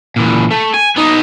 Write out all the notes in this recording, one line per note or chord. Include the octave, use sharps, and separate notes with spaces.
A#2 E3
A3
G#5
B3 D#4